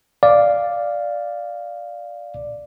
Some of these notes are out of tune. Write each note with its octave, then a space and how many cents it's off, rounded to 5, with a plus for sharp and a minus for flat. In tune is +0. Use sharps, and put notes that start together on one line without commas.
D5 +0 F5 +0